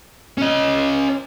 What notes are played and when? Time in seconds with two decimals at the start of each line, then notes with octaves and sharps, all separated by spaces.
0.38 C#4 D#5